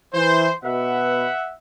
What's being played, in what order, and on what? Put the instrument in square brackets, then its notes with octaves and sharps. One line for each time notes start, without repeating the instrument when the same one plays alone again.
[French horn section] E3 [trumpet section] C5
[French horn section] B2 B4 [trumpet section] E5 F#5